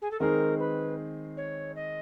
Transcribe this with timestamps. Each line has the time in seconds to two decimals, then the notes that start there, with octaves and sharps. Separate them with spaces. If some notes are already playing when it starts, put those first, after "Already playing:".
0.01 G#4
0.11 A4
0.19 D#3 G#3 C4 D#4 G#4 A#4
0.59 B4
1.37 C#5
1.75 D#5